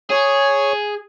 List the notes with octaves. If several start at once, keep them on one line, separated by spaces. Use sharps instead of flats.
G#4 C#5